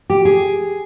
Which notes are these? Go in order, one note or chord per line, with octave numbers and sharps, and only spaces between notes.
G4
G#4